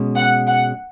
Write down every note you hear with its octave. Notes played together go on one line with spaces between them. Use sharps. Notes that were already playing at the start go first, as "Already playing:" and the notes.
Already playing: B2 G#3 C#4
F#5
F#5